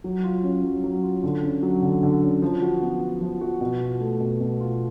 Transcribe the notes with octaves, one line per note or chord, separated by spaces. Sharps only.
F#3
F4
C#4
F#3
F#3
F4
D3
C#4
F#3
D3
D3
C#4
F3
F#4
B3
F3
F3
F#4
B2
F4
A3
B2
B2
F4